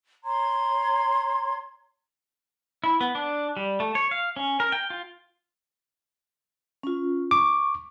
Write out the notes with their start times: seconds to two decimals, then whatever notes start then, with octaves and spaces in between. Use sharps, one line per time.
0.24 C#5 A#5 C6 G#6
2.84 E4
3.01 B3
3.15 D4
3.57 G3
3.80 A3
3.95 C#5
4.11 F5
4.36 C#4
4.60 A#4
4.72 G5
4.90 F4
6.83 C#4 F4
7.31 C#6 D6